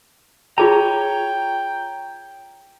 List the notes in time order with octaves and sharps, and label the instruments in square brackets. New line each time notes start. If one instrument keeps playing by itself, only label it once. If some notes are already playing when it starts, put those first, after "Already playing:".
[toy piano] F4 G#4 A5 [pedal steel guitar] C#5 A#5 [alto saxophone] G5